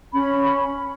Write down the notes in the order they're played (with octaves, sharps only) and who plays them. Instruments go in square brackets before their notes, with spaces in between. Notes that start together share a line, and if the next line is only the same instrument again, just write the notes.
[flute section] C#4 B5